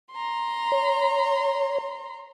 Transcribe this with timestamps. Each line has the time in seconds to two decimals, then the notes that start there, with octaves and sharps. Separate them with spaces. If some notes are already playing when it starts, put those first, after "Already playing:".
0.11 A#5 C6
0.72 C#5